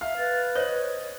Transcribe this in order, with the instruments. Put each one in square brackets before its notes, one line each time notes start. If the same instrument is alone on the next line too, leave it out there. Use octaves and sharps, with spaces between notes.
[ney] E5 [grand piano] F5 F6
[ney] B4 [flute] A6
[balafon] C5 [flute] C#5 [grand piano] D#5 F#7